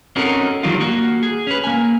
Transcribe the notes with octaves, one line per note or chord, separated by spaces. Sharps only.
C4 C#4 D#4 F#4 A4 A#4
D#3 F#3 G3 D4 D#4 F4
A#3 F#4
G#4
C#4 B4
A#3 G#5